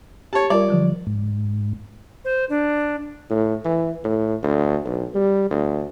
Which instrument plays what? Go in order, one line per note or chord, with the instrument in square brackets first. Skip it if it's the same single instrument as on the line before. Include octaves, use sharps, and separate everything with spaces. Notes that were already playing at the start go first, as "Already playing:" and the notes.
[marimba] G4 [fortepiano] C#5 A5
[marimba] G3 F4 A#4 [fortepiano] D5
[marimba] D3 F3 F#3
[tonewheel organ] G#2
[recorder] C5
D4
[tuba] A2
E3
A2
D2
B1
G3
D2